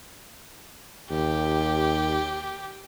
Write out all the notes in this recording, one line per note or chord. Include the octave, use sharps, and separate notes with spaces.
D#2 G4